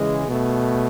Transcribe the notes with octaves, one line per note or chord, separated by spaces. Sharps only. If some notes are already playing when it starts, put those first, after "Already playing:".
Already playing: C#3 E3 G#3
B2 A3